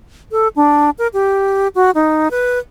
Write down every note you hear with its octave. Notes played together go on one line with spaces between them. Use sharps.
A4
D4
A#4
G4
F#4
D#4
B4